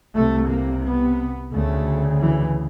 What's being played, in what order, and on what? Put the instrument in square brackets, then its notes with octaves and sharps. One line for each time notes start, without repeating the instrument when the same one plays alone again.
[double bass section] C2 C3 A3
A#3
B3
D2 C#3 A3
E3